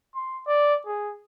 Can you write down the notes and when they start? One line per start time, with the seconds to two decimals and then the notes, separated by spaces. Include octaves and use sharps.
0.15 C6
0.46 D5
0.86 G#4